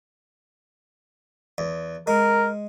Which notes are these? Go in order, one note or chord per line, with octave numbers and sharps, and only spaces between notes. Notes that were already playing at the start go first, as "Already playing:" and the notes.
E2
G#3 A#4